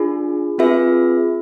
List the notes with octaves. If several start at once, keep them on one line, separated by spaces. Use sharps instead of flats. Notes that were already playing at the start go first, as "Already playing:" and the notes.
Already playing: D4 F4 G#4
C4 F4 G#4 B4 E5